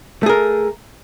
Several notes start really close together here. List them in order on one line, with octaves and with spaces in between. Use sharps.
A3 G#4 A#4